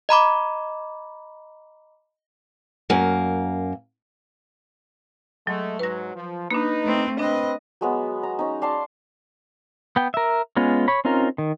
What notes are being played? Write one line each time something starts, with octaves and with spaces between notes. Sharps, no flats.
D#5 A#5 B5 D6
F#2 A#3
F#3 G#3 A3
G#2 F#3 B4 A#6
F3
A#3 D4 D#4 B4
A3 C4
C4 D4 B4 D#5
F#3 G#3 B3
A#5
C#4 D#4
D5 F5 A5 C6
B3 G5
A#4 E5
G#3 B3 C#4 F4
C#5 B5
C4 C#4 D#4 F4 A#4
D#3